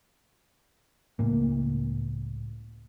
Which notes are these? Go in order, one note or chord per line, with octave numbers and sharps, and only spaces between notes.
C#2 A2 A#3